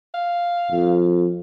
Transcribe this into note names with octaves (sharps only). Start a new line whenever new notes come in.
F5
F2